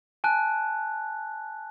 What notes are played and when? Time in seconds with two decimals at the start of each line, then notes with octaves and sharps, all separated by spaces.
0.24 G#5 A5 F#6